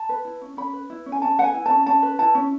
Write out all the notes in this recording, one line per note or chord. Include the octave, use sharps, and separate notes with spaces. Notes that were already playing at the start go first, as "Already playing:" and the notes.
Already playing: A5
B4
E4
C#4
C#4 B5
B4
E4
C#4
G#5
C#4 A5
B4 F#5
G#5
E4
C#4 A5
C#4 A5
B4
E4 A5
C#4